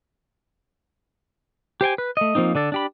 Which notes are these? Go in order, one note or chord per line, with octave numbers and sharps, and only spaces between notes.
G4 C5 G5 G#5
B4
A3 D#5
F3 A#3 C4 D#4
D3 D4 A4
D4 G4 B5